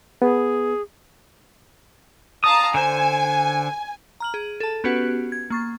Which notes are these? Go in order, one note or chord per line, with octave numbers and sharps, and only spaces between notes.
B3 G#4
F5 A5 A#5 D#6
D3 C5 G#5
A#5 F6 F#7
G#4
A4 A5
B3 C#4 F#4 G4 B4 F#5
G#6
A#3 C#6 A6